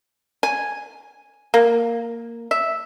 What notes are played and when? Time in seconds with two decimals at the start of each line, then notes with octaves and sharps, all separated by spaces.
0.43 G#5
1.54 A#3
2.51 E5